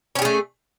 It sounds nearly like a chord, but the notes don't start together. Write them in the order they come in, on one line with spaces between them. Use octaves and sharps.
C#4 G4 G#4 A3